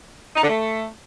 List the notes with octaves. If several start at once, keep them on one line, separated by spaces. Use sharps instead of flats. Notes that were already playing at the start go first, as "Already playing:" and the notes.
D#4
D3
A3